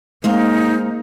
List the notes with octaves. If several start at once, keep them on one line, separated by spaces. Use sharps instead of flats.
G#3 A#3 C4 D#4 F5